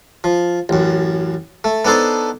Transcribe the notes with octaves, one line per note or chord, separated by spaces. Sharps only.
F3
A1 F#2
A3
B3 D4 D#4 A4 C5